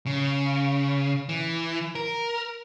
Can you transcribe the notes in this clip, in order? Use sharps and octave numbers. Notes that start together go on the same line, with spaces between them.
C#3
E3
A#4